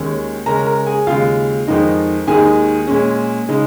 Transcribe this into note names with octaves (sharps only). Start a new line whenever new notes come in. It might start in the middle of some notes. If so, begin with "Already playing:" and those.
Already playing: D#2 D#3 G#3 C#4
C#3 G#3 C#4 A#4 A#5
A#4 A#5
G#4 G#5
D#2 C#3 G#3 F4 F5
F2 D#3 G#3 D#4
D#2 D#3 G#3 D#4 G#4 G#5
A#2 G#3 C#4
C#3 G#3 D#4